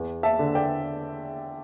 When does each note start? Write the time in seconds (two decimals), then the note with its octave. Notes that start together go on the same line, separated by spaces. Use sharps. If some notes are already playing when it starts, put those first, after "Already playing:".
Already playing: E2
0.23 E5 A5
0.39 D3
0.55 D5 G5